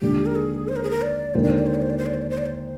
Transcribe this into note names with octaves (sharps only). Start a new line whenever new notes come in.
D#2 D3 F3 G#3 D4 G4
A#4
G#4
C5
A#4
G#4
A#4
D5
D#2 D3 G#3 D#4 A#4 C5
D5
C5
D5
C5
D5
C5
D5
C5
D5
C5
D5
C5
D5
C5